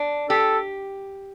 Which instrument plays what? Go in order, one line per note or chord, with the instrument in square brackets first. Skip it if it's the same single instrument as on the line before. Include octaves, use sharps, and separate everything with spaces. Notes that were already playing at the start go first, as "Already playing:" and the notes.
Already playing: [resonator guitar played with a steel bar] D4
[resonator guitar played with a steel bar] G4 [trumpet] A4